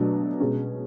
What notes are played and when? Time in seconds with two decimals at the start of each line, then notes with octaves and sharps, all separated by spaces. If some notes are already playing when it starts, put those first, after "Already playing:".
Already playing: B2 F#3 A3 D4
0.40 B2 G#3 C#4